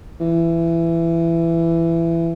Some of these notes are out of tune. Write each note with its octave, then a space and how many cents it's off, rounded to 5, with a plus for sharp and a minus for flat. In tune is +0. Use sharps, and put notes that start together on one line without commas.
E3 +15